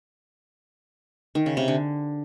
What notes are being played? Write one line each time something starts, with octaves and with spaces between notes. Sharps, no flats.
D#3
C#3
C3
D3